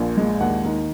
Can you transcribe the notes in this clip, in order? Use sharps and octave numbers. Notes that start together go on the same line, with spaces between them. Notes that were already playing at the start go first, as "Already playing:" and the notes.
Already playing: A#1 A#2
G#3
D#2 F#5
D#3